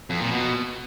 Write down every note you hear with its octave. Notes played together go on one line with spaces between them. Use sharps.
F2
A#2
B2